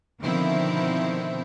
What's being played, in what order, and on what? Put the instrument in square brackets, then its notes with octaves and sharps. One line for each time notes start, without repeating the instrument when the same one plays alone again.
[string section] B2 D3 D#3 F3 C4 E4